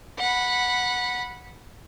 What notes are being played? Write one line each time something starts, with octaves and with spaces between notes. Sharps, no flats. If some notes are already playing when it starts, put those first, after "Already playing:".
F#5 B5